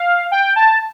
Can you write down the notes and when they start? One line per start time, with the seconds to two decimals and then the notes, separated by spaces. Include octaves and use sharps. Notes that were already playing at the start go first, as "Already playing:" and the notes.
Already playing: F5
0.32 G5
0.56 A5